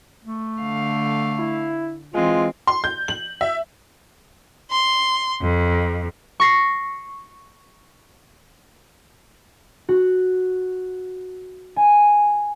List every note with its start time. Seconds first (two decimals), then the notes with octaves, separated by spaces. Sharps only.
0.24 A3
0.61 D3 F5
1.39 E4
2.14 E3 G#3 C4 F4
2.67 C6
2.84 G6
3.08 F#7
3.41 E5
4.71 C6
5.42 F2
6.40 C#6 A#6 C7
9.89 F#4
11.76 G#5